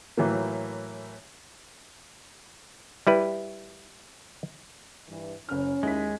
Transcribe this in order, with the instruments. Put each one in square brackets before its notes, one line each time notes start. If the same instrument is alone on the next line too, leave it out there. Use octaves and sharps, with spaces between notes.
[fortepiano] A2 E3 F#3 A#3
[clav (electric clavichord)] G3 E4 B4
[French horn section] G2 E3
[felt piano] F#1 F6 [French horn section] C#4
[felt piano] D#2 E4 B6 [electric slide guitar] G#3